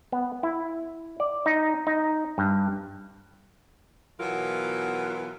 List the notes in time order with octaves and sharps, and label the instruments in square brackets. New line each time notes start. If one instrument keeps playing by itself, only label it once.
[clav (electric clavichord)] B3
E4
D5
D#4
D#4
G2
[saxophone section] B2 E3 F#3 B3 F4 A#4